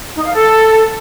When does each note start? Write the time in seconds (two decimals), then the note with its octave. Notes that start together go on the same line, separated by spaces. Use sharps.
0.16 D#4
0.25 F5
0.34 A4